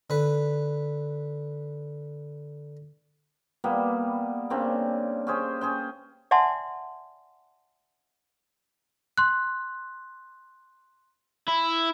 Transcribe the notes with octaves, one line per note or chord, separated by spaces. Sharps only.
D3 B4
G3 A#3 B3
C#3 A#3 C4 D4
C#4 G4 G#4 C5
C#4 G#4 C5 G5
D5 E5 F#5 G#5 A5 C6
C6 F#6
E4